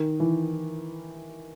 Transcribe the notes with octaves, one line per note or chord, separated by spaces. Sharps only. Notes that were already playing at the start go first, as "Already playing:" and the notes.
Already playing: D#3
E3